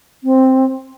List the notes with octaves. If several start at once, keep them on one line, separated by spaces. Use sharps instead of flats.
C4